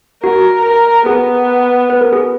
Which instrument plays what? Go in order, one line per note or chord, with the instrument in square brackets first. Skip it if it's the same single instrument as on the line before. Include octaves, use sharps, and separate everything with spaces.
[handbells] F#4 [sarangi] A#4
[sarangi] A#4
[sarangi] B3 [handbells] G#4
[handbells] B4
A#4
G#4